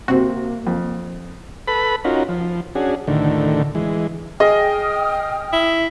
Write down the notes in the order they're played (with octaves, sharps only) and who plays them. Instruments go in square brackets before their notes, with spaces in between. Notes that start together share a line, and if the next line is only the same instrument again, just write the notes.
[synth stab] G1 C4 F#4 [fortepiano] C3 [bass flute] A#3
[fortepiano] F2
[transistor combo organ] A4 B4 B5
C#4 D#4 F4 F#4 A#4
F3
C#4 D4 F#4 G#4
D2 A2 D3 D#3
E3 G#3
[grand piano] G#4 D#5 [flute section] G5 D#6 F6
[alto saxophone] E4